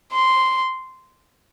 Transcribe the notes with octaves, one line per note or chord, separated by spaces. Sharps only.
C6